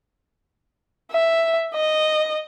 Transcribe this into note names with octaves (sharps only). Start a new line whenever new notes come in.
E5
D#5